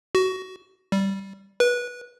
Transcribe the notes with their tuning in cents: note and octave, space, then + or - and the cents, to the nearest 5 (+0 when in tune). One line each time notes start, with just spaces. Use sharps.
F#4 +20
G3 -10
B4 -20